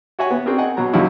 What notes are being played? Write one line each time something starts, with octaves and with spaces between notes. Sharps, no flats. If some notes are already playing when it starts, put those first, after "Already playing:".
F#4 C#5 E5 F#5 G#5
B3
C4 D4 F#4 G#4 A#4
D#5 F#5 G#5
B2 F#3 A#5
F#2 C#3 F#3 A#3 D#4 E4